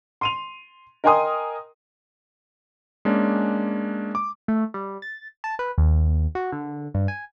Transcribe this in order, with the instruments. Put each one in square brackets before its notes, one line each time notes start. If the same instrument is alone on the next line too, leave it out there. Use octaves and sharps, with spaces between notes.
[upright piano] C6 D#7 F7
A#4 D#5 G5 G#5 C6 D#6
[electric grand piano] G#3 A#3 C#4 D4
D6
[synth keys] A3
G3
A6
A5
B4
D#2
F#4
D3
G2
G#5